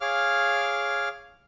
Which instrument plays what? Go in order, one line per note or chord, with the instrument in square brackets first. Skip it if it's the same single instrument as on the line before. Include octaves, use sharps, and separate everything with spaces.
[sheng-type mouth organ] G#4 C#5 F5 D6 F6